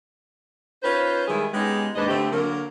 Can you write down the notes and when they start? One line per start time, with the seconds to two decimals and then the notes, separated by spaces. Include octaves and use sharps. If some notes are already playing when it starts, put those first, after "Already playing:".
0.83 C#4 D#4 F4 B4 C5
1.28 D#3 G3 G#3 E4 G#4
1.53 G#3 B3 C#4 D#4 G4 G#4
1.95 D#2 G#2 D4 B4 D#5
2.08 D3 A3 C4 E4 G4
2.31 D3 F#3 A#3 A#4